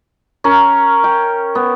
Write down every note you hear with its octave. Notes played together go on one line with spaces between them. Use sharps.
C#4 A#4
G5
B3